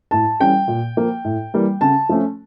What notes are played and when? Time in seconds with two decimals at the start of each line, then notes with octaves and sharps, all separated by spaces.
0.11 A2 A5
0.40 E3 G3 C#4 G5
0.68 A#2
0.97 F3 A#3
1.24 A2
1.54 E3 G3 A#3
1.81 C#3 A5
2.09 F3 A3 C#4